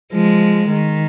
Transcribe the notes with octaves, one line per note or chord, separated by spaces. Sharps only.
F3 G#3
D#3